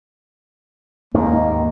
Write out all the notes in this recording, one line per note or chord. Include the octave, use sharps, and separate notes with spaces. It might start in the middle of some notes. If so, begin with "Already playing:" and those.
D#2 G#2 D#3 A#3